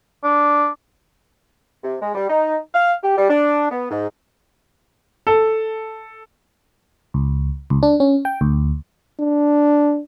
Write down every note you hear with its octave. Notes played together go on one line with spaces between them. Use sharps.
D4
C3
G#3
G3
D#4
F5
G4
G3
D4
B3
G#2
A4
C#2
C#2
D4
C#4
G5
D2
D4